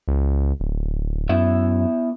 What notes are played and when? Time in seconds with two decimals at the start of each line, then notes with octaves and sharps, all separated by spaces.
0.08 C#2
0.60 D1
1.29 F#2 B3 E4 E5